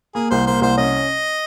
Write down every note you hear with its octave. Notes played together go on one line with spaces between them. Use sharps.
A#3 G#4
C2 C5
A#3 C5
C2 C5
C#4 D#5